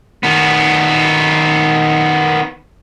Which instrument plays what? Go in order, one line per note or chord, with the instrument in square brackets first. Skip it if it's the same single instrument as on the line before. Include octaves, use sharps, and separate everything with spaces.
[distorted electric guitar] D#3 B3